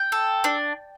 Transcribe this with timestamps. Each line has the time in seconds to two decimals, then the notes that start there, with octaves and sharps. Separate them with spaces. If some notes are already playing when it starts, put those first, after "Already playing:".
Already playing: G5
0.12 A4
0.44 D4